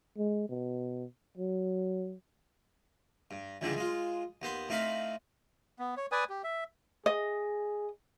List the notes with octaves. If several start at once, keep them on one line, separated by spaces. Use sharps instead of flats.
G#3
B2
F#3
G2
C#2 G#2 D3 E3 G3 G#3
G#3 F4
D#2 B3 C5
A2 C4 D#4 F5 B5
B3
C#5
B4 D5 G#5 D#6
G4
E5
G#4 D#5